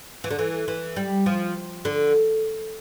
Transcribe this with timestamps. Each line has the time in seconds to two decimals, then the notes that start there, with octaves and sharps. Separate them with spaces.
0.24 E3
0.31 D3
0.39 E3
0.68 E3
0.96 G3
1.26 F3
1.85 D3